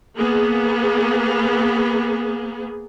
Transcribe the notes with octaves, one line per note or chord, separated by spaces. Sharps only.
A#3 B3 G#4